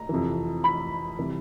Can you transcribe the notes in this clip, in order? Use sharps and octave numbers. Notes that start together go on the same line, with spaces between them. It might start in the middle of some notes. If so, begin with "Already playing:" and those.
Already playing: A#5
F2 C3 E3
B5
C3 E3 G3